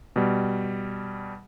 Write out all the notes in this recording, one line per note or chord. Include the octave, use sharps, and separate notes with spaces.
B2 G3